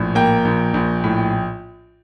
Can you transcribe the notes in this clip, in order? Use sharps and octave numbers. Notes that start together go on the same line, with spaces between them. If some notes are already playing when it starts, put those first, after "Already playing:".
Already playing: A#1 A2
A#3 G5
A#1
A#1
A2